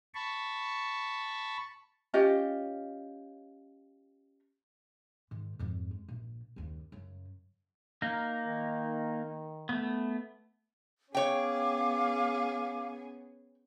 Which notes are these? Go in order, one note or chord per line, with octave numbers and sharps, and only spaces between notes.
A5 B5 C#6
C#4 F4 G4 D#5
G#2 D#3
F2 G#2
G#3
A#1
F#1 D#2
F#2 C#3
A#3 D#4 A#4
D#3
A3 B3
B3 C#4 G#4 C#5 F5 G5 D6